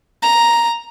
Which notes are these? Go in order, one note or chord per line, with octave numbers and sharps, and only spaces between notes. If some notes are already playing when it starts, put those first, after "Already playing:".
A#5